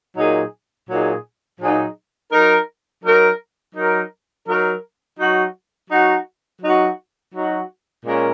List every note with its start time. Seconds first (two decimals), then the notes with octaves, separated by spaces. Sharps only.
0.17 A#2 F#3 D#4 G#4
0.90 A#2 F#3 D#4 G#4
1.60 A#2 F#3 D#4 G#4
2.32 F#3 D#4 A#4
3.04 F#3 D#4 A#4
3.75 F#3 D#4 A#4
4.48 F#3 D#4 A#4
5.20 F#3 D#4 F#4
5.90 F#3 D#4 F#4
6.62 F#3 D#4 F#4
7.35 F#3 D#4 F#4
8.06 A#2 G#3 C#4 A#4